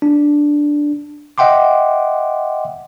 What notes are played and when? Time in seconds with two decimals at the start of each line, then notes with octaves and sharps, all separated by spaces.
0.02 D4
1.38 D#5 E5 F#5 G5 C6 D6